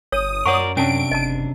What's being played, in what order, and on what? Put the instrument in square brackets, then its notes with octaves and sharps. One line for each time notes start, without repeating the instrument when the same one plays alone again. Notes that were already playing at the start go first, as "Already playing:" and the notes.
[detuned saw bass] G1 [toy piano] C#5 [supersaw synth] D#6
[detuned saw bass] F#2 [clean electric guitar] A#4 D5 [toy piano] C#5 F#5 C#6
[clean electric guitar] C3 D4 [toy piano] C#4 A5 [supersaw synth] D7
[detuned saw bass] F#1 [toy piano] D#5 A5